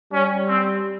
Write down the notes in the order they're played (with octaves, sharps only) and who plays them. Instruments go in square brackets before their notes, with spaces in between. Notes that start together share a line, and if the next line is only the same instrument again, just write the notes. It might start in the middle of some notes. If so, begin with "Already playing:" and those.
[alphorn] G3 [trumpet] C#4
[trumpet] C4